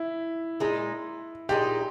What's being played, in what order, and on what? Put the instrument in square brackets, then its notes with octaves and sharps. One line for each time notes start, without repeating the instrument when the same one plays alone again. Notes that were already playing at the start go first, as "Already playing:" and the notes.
Already playing: [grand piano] E4
[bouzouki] A#2 G#3 D#4
[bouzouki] A#2 G#3 D#4 [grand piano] G4